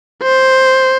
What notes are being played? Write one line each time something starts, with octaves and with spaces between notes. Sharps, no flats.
C5